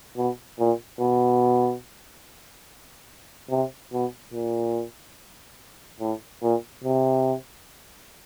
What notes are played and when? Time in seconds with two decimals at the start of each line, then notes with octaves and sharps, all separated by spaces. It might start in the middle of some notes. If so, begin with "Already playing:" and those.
0.16 B2
0.59 A#2
1.00 B2
3.50 C3
3.93 B2
4.33 A#2
6.00 A2
6.42 A#2
6.84 C3